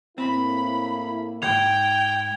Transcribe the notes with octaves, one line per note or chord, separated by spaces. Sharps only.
A2 A#3 C4 E4 B5
D2 G#2 G5 G#6 F7